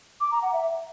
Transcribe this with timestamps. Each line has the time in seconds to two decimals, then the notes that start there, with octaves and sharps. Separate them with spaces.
0.20 D6
0.31 A#5
0.42 F#5
0.53 E5